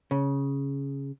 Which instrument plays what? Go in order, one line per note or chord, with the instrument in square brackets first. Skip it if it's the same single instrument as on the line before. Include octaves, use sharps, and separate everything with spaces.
[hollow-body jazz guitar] C#3